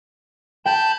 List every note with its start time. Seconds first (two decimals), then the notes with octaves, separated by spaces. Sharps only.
0.66 G5 A5 B5 G6